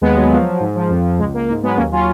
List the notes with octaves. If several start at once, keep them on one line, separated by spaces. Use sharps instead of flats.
D#2 G#3 B3
F#3
F3
F3
G#2
F3
F2
F2
C#2 G#3
C#2 A#3
G#2 A#3
F#3 G#3 B3
D#2 A#3 C#4
F#3 C#4 F4